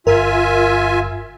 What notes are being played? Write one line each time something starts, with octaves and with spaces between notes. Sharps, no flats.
G1 F4 A#4 E5 G#5